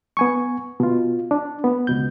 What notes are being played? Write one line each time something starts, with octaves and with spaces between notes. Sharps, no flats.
B3 G#5 C#6
B2 F4
D4
B3
C#2 B2 G6